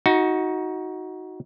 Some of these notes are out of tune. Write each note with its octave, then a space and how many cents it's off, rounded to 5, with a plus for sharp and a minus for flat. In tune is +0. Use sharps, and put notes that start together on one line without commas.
D#4 +25 F#4 +0